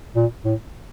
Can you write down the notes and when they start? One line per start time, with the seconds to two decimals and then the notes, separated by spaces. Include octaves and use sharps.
0.16 A#2
0.45 A2